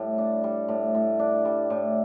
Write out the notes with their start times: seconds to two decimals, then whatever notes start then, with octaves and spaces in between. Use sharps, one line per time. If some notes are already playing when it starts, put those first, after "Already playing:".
Already playing: A2 G3
0.18 D4
0.44 G3
0.68 A2
0.95 A2
1.19 D4
1.45 G3
1.70 A2